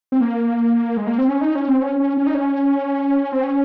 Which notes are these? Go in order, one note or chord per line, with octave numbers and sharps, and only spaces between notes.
C4
A#3
G#3
A#3
C4
C#4
D#4
C#4
C4
C#4
C#4
C#4
D#4
C#4
C4
C#4